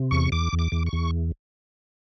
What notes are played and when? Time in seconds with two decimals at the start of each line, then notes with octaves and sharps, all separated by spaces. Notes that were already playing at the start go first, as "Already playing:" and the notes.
Already playing: C3
0.11 E2 C#6
0.32 E2 D6
0.53 E2
0.59 D6
0.72 E2
0.86 C#6
0.93 E2